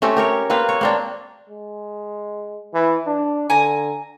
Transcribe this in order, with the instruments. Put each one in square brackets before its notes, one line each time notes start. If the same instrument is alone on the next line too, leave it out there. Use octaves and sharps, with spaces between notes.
[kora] A3 C4 C#4 G4
G4 A#4 C#5
A#3 C4 B4 F5
C#5
A#3 C4 D4
[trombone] G#3
E3
D4
[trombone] D3 [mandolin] G#5 A#5